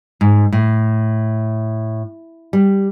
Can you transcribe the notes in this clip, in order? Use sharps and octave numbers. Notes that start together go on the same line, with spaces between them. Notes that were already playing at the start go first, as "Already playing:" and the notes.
G#2
A2
G3